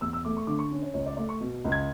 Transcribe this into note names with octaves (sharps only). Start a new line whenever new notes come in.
E2 E6
E6
A3 D6
C#6
D3 D6
C#6
C#4
C#5
C#2 C#5
D5
A3 D5
C#6
B2
C#2
G#6